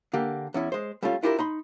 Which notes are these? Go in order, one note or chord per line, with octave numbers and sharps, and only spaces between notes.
D3 A#3 G4
E2 C#4 E4
G#3 C5
G3 A3 C#4 F4
D4 E4 F4 G4 A4 A#4
D#4 B5 C6